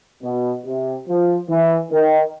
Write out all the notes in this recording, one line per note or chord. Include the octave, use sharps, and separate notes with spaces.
B2
C3
F3
E3
D#3